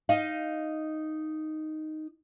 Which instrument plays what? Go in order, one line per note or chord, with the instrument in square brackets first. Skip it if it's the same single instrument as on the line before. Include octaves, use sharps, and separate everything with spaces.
[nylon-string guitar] D#4 D#5 F5